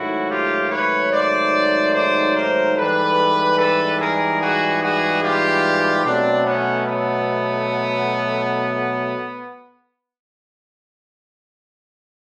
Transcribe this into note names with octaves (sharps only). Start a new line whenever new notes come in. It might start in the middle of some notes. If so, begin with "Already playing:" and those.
Already playing: G#2 D#3 F#3 A3 E4 F#4
F4 G4
B4 C#5
C5 D5
C5 D5
A#4 C5
G#2 E3 G3 A4 B4
A4 B4
G#4 A#4
F#4 G#4
F#4 G#4
F4 G4
B2 F#3 A3 C4 D4
B3 C#4
B3